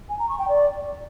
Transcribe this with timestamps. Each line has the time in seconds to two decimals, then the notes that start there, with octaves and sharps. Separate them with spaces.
0.09 G#5
0.19 A#5
0.29 C#6
0.39 G5
0.48 D5